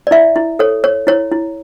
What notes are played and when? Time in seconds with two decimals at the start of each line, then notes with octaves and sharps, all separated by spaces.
0.07 D5
0.11 E4 E5
0.36 E4
0.59 A4 C#5
0.84 C#5
1.07 E4 C#5
1.32 E4